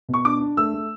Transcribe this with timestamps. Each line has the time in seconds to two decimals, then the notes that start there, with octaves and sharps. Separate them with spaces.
0.09 B2
0.14 C#6
0.25 D4 D6
0.41 D4
0.57 A3 E6
0.74 A3